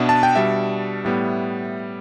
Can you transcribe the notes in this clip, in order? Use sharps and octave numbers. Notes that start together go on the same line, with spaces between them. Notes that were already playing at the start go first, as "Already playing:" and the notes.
Already playing: B2 B3 D4 E5
A5
G5
B2 G3 D4 E5
A2 G3 B3